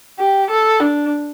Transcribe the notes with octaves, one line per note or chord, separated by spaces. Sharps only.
G4
A4
D4